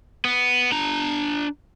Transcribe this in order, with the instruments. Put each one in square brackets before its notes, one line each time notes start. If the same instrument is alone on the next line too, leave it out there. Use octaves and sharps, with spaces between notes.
[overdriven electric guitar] B3
D4 A#5